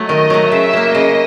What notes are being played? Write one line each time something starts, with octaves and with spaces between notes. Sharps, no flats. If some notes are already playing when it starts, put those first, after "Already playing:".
Already playing: F#3 A3
D#3 D#5
F#3 A3
C#3 E5
F#3 A#3
C#3 D#5